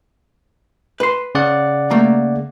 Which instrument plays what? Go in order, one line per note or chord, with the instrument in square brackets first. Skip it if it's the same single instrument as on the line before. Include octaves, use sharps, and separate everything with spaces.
[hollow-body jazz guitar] B4 C6
[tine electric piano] C#3 D5 F#5
[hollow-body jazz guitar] A3 A#3 A#5